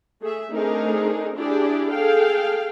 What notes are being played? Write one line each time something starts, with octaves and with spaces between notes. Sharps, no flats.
A3 G#4 E5
A3 C4 D4 D#4 G#4 A#4
D4 E4 G4 G#4 D5
G#4 A4 F5 G5